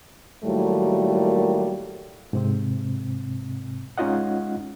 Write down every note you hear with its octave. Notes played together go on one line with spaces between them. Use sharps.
A2 D#3 F#3 G3 A3 A#3
G#2 C3 C4
G#3 C#4 D#4 F4 D#5 F#5